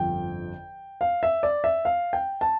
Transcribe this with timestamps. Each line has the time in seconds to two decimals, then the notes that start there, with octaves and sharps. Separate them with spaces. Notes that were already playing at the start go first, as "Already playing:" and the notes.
Already playing: G1 F2 D3 F3 G5
1.01 F5
1.23 E5
1.43 D5
1.64 E5
1.85 F5
2.13 G5
2.41 A5